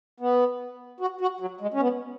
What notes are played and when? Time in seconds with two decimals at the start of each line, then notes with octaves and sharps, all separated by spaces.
0.20 B3
1.00 F#4
1.21 F#4
1.40 F#3
1.61 G#3
1.74 C#4
1.80 B3